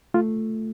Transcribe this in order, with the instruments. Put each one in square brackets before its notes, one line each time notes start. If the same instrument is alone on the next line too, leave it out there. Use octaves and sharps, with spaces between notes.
[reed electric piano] A3 F4